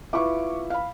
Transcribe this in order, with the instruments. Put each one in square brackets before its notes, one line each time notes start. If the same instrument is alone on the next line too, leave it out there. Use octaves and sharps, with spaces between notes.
[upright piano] E4 F4 B4 [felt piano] C#6 D6
[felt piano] F5 B5